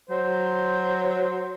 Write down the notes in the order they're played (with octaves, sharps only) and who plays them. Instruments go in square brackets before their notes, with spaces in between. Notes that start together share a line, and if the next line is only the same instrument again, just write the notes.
[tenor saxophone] F#3 [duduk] C5